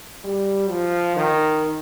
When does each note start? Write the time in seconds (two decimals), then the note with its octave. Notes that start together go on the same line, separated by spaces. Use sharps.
0.24 G3
0.69 F3
1.16 D#3